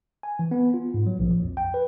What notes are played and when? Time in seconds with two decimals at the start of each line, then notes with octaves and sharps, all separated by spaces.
0.23 G#5
0.39 E3
0.51 B3
0.74 F4
0.94 G#2
1.06 F#3
1.19 A#1
1.31 F3
1.43 F2
1.57 G5
1.74 B4